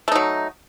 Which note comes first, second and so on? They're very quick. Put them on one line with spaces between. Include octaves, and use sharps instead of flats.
A3 D#4 F#3